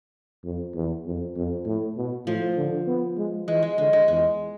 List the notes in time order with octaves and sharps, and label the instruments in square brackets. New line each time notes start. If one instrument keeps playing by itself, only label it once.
[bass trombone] F2
E2
F2
F2
A2
B2
[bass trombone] A2 [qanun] F3
[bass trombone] D3
B3
G#3
[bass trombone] E3 [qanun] G#3
[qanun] G#3
[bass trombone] D3 [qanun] G#3
[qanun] G#3
[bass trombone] E2 [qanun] G#3